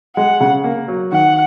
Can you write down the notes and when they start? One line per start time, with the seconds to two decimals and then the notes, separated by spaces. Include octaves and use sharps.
0.16 G#3 F#5
0.40 C#3
0.64 A#3
0.88 F#3
1.12 D#3 F#5